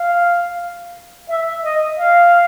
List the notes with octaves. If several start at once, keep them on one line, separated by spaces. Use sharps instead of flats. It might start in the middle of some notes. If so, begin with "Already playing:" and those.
Already playing: F5
E5
D#5
F5